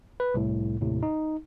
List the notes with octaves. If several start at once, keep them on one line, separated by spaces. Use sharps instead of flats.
B4
C2 A2
D#2 A2 C3
D#4